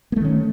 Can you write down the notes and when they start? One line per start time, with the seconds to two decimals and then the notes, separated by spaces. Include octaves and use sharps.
0.12 A#3
0.16 A3
0.21 D#3
0.25 C#4